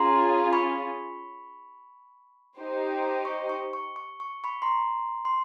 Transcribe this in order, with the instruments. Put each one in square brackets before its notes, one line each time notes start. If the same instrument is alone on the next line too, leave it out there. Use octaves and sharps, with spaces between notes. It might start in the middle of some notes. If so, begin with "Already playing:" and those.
Already playing: [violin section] C#4 F4 G#4 [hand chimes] A#5 C6
[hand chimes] B5 C#6
[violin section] D#4 G4 C5
[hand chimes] C#6
C#6
C#6
C#6
C#6
B5 C#6
A#5 C6
C6